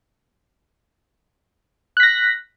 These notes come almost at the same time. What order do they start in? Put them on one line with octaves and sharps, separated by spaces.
F#6 B6 A#6